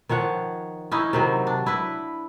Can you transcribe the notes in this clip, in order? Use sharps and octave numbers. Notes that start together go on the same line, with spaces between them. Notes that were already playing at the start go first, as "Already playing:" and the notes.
D#3 F3 C#5 F#5
C#4 D#4 E4 D#5
C3 D#3 F#3
D4
E4 B4